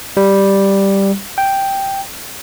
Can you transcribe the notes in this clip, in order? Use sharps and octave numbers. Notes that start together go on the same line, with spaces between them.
G3
G5